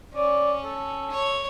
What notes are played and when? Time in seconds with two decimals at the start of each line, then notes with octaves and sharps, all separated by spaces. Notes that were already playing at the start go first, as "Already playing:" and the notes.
0.14 C#4 D5
0.64 A4
1.10 C#5